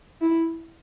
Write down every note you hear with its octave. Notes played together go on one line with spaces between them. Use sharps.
E4